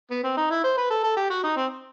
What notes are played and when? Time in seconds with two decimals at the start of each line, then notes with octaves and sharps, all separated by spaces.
0.11 B3
0.24 C4
0.37 D#4
0.50 E4
0.64 C5
0.77 B4
0.90 A4
1.04 A4
1.17 G4
1.30 F#4
1.44 D#4
1.56 C4